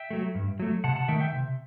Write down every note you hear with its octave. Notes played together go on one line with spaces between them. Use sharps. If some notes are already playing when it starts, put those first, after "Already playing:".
Already playing: E5 G5
F#3 A3
G2
F#3 A3
C3 F#5 A5
F#5 A5
D#3 A3 E5 G5
E5 G5
C3